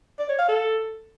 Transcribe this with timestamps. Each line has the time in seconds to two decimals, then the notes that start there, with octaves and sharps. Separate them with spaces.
0.19 D5
0.29 C#5
0.39 F5
0.48 A4